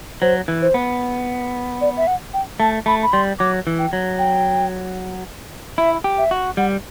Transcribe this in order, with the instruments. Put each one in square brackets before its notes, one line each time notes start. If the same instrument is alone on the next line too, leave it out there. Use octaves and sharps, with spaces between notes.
[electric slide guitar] F#3 [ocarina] C5
[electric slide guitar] E3
[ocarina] C5
[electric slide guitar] B3
[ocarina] D5
E5
F#5
G5
[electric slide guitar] A3 [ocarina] A5
[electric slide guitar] A3 [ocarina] B5
[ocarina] B5
[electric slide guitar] G3 [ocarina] C6
[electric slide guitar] F#3 [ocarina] D6
[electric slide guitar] E3
[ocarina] G5
[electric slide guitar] F#3
[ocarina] G5
[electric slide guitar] E4 [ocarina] E5
[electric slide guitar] G4
[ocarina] E5
[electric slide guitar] F#4
[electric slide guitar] G3 [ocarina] F#5